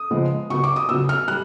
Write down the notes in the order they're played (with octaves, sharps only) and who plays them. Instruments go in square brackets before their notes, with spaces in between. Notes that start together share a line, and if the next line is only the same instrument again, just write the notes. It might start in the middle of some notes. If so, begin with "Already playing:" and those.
Already playing: [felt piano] D#6
C#3 F3 G#3 B3
C#3 F#3 B3 C#6
D6
D#6
C#3 F#3 B3 E6
F6
G3 F#6